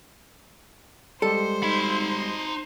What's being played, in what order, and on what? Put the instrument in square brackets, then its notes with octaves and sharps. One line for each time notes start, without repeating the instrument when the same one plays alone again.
[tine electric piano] G3 G#3 G4 [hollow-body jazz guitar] A4 [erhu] C5
[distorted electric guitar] D#4 B5